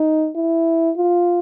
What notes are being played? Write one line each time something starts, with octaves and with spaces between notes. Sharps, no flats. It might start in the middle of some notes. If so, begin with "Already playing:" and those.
Already playing: D#4
E4
F4